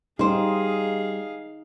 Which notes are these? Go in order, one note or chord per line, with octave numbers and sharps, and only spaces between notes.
G3 D#4 G#4 C5 F5